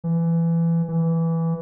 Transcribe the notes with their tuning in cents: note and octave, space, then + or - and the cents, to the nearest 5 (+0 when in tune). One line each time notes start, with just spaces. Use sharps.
E3 +20
E3 +0